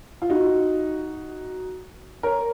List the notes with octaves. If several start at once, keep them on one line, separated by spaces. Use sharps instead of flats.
F4
D#4 F#4
A#4 C#5